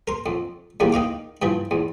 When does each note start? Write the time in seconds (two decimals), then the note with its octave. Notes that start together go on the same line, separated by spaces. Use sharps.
0.07 A#4 C6
0.26 F2
0.80 E2 D#3 G3 A#3
0.92 D#3 D#5 F5 D6
1.42 G2 E3 F3
1.71 E2